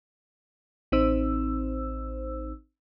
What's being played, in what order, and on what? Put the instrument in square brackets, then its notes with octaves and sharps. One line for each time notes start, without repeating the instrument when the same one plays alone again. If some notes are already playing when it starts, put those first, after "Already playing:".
[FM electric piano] A1 C4 D#4 C5 E6